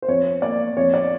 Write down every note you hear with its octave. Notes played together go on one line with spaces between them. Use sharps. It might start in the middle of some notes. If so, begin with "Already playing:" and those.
C5
F2 C#5
A#3 D5
F2 C#5
D5